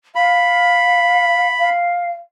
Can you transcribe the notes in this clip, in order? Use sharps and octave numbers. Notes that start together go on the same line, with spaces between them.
F5 B5
F5